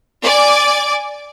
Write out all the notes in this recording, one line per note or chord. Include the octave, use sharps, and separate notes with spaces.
D5 G#5 D6